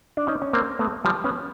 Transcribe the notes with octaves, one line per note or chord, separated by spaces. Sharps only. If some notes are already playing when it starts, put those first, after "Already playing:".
D4
C#4 D#4
C#4
A#3 C4
A3 B3
F3 G3
B3 C#4